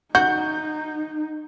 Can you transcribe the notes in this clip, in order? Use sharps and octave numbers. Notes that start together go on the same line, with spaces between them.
D#4 F#4 G6